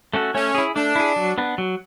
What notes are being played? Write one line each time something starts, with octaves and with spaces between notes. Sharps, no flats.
A3 C#4 F#4 A4
A3 C#4
E4 G#4
A3 D4
E4 G#4
F#3
B3 D4
F#3